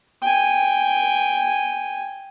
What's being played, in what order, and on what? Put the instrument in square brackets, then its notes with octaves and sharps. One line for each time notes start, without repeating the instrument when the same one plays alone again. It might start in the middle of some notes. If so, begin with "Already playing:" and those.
[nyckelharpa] G5 G#5